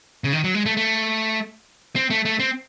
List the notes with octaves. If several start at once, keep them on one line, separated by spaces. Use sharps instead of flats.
C#3
D#3
F#3
G#3
A3
A3
C4
A3
A3
C4